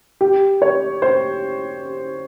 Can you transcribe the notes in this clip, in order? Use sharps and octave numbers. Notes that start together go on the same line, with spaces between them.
G4
C#5
C5